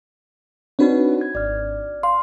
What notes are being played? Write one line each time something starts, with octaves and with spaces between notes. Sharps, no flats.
C4 D4 D#4 F#4 B4 C#5
G#6
G#1 D5 F6
F5 C6